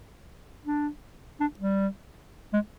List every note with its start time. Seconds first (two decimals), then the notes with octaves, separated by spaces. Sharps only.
0.65 D4
1.40 D4
1.59 G3
2.53 G#3